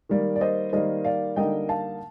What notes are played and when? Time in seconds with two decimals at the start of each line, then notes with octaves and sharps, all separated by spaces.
0.09 D#3 G3 A#3
0.36 D5
0.41 C5 D#5
0.73 D#3 G3 A#3 C5 D#5
1.05 D5 F5
1.36 D3 G3 A#3 D#4 D#5 G5
1.69 F5 A5